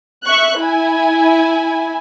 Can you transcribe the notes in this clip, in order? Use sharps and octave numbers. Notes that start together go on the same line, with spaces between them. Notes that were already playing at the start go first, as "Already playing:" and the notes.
E5 C#6 F#6
E4 G#5